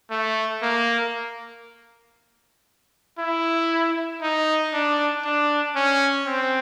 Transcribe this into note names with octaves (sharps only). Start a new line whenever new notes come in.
A3
A#3
E4
D#4
D4
D4
C#4
C4